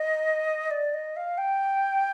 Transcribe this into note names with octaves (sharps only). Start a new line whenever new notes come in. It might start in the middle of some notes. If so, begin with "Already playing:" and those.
Already playing: D#5
D5
D#5
F5
G5